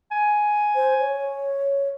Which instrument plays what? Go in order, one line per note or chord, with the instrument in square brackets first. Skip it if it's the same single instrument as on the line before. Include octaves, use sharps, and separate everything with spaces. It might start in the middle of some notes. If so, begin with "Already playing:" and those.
[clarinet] G#5
[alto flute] C5
C#5